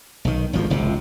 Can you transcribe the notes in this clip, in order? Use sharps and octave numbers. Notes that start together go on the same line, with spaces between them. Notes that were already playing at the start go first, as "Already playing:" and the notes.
B1 D#3
G#1 D2 F3
F#1 C#2 C3